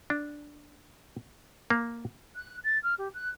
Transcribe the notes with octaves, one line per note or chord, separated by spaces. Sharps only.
D4
A#3
F#6
A6
F6
G4
F#6